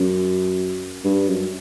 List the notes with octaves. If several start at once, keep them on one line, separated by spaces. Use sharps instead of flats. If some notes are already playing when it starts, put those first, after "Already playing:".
Already playing: F#2
G2
F#2